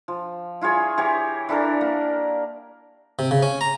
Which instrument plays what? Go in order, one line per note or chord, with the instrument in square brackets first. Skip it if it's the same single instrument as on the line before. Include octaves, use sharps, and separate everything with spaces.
[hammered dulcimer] F3
E4 F4 G#4 C#5
E3 G4 C#5
E3 D4 A4 A#4
A#3
[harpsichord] C3
C#3
C#4
A#5